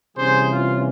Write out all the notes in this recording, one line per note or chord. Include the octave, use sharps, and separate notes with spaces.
C3 E3 G3 C#4 G#4 C5
F4